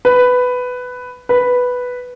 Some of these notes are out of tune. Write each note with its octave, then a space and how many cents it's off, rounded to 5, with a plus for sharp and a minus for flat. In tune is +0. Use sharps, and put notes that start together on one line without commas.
B4 +10
B4 +0